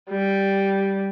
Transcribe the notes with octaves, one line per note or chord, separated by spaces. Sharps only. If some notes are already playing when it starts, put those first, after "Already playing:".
G3